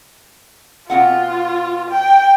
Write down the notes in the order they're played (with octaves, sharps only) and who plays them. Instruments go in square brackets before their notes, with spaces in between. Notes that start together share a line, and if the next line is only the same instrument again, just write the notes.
[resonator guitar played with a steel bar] B2 C4 F#5 [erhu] F4
[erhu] G5